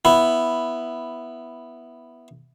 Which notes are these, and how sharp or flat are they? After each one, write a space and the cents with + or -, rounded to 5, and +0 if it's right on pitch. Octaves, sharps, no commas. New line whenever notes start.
B3 +0 E4 +0